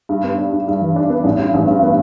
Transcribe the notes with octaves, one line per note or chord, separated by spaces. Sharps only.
G2
B3
D4
G2
G2
E3
D4
B3
A1
G2
A1
G2
B3